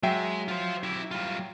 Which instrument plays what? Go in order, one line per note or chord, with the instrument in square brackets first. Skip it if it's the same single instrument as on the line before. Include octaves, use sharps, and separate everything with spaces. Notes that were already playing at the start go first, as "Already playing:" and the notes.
[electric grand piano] F#3 E5 G5 [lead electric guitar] G#3
[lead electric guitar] F4 C5
E4 G4
G3 F4